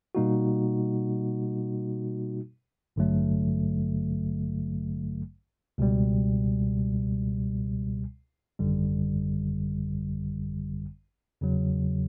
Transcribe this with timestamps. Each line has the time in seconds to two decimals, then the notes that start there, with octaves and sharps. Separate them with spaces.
0.15 B2 G3 A#3 D#4 F#4
2.96 A1 G2 D3 F#3 A3
5.78 C#2 B2 G3
8.59 G#1 F#2 D3 G3
11.41 E2 C#3 F#3